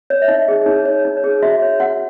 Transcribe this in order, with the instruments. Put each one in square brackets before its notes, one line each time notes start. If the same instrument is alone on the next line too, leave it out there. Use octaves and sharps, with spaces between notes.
[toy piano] C#5
E5
D#4 D#5
G#4
D#4 C#5
C#5
D#4
C#5
G#4
F#4 E5
C#5
F#4 F#5